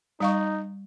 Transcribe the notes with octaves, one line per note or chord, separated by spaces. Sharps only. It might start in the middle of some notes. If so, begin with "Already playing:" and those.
G3 D#4 F5 C#6